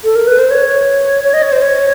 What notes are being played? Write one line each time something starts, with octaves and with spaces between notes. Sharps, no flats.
A4
A#4
B4
C5
C#5
C#5
D#5
C#5
C5
C#5